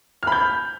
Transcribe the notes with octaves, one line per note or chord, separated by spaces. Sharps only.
B5 F6 G6